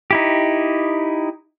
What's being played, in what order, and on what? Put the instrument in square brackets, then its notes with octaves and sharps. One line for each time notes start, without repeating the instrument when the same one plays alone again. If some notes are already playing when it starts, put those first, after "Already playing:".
[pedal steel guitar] D#4 E4 G4